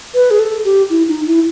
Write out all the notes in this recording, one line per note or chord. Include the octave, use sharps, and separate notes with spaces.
B4
G#4
A4
G4
E4
D#4
E4